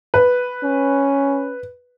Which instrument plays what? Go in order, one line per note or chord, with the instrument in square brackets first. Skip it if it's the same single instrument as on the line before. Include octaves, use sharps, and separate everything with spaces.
[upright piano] B4
[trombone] C#4